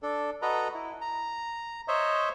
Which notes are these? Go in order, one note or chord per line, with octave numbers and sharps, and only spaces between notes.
D4 A4
F#4 A4 B4 D#5 A#5
E4
A#5
C5 C#5 D#5 E5